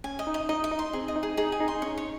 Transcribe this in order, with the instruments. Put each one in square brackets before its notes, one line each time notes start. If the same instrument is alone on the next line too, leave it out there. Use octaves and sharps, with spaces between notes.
[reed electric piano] C#4 [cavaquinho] G#5
[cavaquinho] D#5
[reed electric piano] D#4
[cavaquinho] D#5
[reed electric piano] D#4 [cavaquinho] D#5
[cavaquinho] D#5
[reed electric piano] D#4
[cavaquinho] C6
[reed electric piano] C4 [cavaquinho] G#4
[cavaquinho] D#5
[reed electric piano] D#4
[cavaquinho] G#4
[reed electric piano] D#4 [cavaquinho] G#4
[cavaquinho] G#5
[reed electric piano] D#4
[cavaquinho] C6
[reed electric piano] C#4 [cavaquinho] C#5
[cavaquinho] C#5